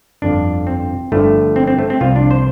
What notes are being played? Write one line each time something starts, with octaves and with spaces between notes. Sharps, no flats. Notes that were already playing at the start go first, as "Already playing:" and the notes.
G1 F2 D3 F3 D4
C4
G1 G2 D3 F3 A3
C4
C4
A3
C4
C2 C3 F3 F4
D4
C5